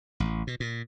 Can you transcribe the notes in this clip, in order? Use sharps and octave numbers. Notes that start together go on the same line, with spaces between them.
A1
B2
A#2